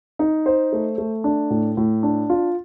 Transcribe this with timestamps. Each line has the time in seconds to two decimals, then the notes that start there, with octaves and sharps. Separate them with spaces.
0.19 D#4
0.46 C5
0.72 A3
0.98 A3
1.24 D4
1.50 A2
1.77 A2
2.03 D4
2.30 F4